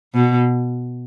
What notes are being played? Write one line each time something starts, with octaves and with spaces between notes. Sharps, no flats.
B2